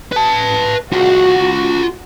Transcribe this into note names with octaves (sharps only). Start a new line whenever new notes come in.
B4 A5
F4 F#4 G#4